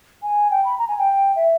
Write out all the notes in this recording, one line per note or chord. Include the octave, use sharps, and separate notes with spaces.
G#5
G5
B5
A#5
G#5
G5
E5